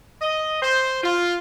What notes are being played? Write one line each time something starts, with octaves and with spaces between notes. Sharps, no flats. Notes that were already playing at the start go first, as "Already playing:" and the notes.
D#5
C5
F4